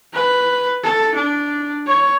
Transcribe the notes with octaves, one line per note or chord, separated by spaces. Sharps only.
B4
A4
D4
C#5